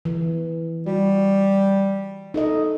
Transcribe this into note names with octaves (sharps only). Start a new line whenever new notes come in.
E3
G3 F#4
D#4 A4 D#5